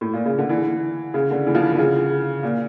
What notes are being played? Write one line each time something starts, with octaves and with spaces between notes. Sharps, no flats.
A2
A#2
C#3
D3
E3
C#3
D3
E3
F3
E3
D3
C#3
A#2